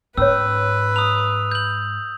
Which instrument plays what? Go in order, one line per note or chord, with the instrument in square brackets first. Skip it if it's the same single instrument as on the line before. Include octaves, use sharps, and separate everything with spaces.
[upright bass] G#2 [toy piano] C#4 C#5 [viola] B4 [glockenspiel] E6
[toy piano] A#5 [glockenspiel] D#6 F7
[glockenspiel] G6 F#7